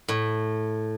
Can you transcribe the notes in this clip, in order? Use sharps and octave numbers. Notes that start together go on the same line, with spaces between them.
A2